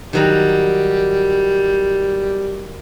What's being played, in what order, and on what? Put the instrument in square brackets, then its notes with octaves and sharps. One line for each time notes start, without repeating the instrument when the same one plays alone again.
[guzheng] D#3 F#3 A#5 [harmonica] G3